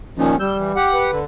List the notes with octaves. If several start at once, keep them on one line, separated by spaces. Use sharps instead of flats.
A#2 D#3 F3 C#4
G3 E6 G6
E3
G4 F#5
B4
D3